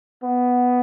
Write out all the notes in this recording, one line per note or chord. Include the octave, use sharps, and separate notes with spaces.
B3